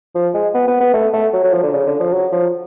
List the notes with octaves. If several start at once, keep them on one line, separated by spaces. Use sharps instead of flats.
F3
G#3
B3
B3
B3
A3
A3
F#3
F#3
F3
D3
C#3
D3
F3
F#3
F3